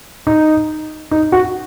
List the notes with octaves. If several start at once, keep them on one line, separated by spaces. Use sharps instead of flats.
D#4
D#4
F#4